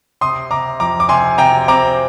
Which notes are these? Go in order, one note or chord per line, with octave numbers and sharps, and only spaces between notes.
C3 C6 D#6
C3 A#5 D6
F2 A#5 D6
D6
C3 G#5 C6
C3 G5 A#5
C4 A#5 D6